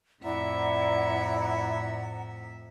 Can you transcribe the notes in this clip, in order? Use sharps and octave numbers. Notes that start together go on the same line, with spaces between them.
F2 A2 E4 D5 E5 F#5 A#5